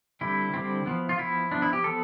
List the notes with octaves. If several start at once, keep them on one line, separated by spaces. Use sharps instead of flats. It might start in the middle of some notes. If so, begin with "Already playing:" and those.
D3 G3 C4 E4
D3 G3 C4
F3 B3
F4
F3 B3 E4
F3 B3 D4
E4
G4
F3 B3 A4